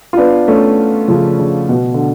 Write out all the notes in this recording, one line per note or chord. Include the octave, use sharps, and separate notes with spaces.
F4
B3 D4
A3 C#4
C#3 F3
C#3
B2
D3